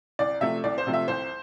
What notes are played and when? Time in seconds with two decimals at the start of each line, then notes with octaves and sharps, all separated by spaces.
0.19 C2 D5
0.41 C3 F3 A3 E5
0.64 C2 D5
0.78 C5
0.86 C3 F3 A3
0.93 E5
1.08 C2 C5